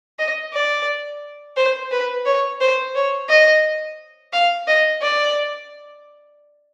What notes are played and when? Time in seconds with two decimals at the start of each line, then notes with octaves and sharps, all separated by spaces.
0.19 D#5
0.53 D5
1.57 C5
1.91 B4
2.26 C#5
2.60 C5
2.95 C#5
3.29 D#5
4.33 F5
4.68 D#5
5.02 D5